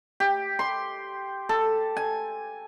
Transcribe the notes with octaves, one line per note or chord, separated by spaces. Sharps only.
G4
C6
A4
G#5